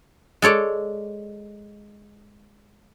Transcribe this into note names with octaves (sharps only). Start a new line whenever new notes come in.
G#3 A4 C#5 D5